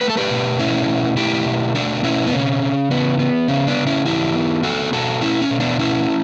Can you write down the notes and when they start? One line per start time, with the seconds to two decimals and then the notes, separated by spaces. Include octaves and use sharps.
0.01 A3 B4
0.09 A4
0.17 G4 B4
0.30 B2
0.59 A3 C#4 E4
0.88 B2
1.17 A3 E4 G4
1.46 B2
1.74 A3 D4 F#4
2.04 B2 C#4 E4
2.27 B3
2.33 C#3 C#4
2.61 C#3
2.90 E3 B3
3.19 B3
3.48 C#3 C#4
3.67 B3 D4
3.77 C#3
3.87 C#4 E4
4.06 E3 E4 G4
4.35 B3
4.63 A3 F#4 A4
4.93 B2 F#4 A4
5.21 A3 C#4 E4
5.41 C#4
5.51 B2
5.60 B3 D4
5.79 A3 C#4 E4